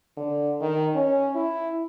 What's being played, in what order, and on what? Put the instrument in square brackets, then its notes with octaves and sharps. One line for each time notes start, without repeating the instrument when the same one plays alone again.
[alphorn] D3
D#3
C#4
E4